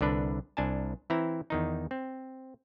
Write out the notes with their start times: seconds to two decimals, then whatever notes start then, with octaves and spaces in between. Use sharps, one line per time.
0.01 C2 D3 D4 B4
0.57 C2 D4 G#5 A5
1.10 E3 C4 E4 A#5
1.50 E2 D#3 D#4
1.91 C4